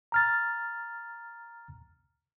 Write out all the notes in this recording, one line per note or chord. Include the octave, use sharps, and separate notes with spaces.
A#5 F6 A6